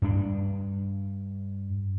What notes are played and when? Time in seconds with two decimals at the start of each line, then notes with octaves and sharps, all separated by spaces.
0.02 G2 D4